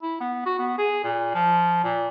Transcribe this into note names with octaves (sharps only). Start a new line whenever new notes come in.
E4
B3
F#4
B3
G#4
A#2
F3
A#2